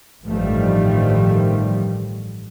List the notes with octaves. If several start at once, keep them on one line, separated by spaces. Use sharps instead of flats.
A1 G2 D#3 F3 G3 A3